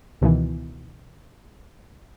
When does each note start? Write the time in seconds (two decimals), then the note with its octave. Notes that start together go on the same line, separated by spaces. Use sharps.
0.21 C#2 B2 D#3 E3